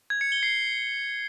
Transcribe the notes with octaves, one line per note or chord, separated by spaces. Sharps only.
G#6
C#7
G7
C7